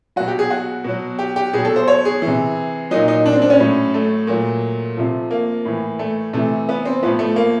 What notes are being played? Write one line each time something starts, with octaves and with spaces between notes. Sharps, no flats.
B2 F#3 F#4
G4
G#4
F#4
B2 F#3
G4
G4
B2 F#3 G#4
A4
C5
C#5
G#4
E3
C3
A#2 F#3 D#4
D#4
D4
C4
D4
C#4
A2 F#3
A3
A#2 F#3
C3 F3
A#3
A2 E3
A3
C3 E3 A3
B3
C4
A2 F3 B3
A3
A#3